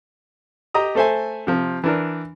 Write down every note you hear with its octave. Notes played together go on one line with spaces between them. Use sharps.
G4 D#5 A#5 D#6
A3 A4 C5 E5 G#5
C3 F3
E3 D4 A#4